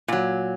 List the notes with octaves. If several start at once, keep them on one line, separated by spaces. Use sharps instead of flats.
A#2 F#3